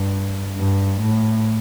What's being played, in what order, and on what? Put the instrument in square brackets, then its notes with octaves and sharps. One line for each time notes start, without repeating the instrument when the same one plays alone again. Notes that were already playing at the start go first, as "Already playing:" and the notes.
Already playing: [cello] G2
G2
A2